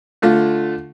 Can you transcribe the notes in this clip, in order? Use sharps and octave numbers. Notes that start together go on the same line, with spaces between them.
D3 A3 F4